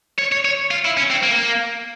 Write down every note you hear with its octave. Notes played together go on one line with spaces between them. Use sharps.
C#5
C#5
C#5
F4
E4
C#4
C4
A#3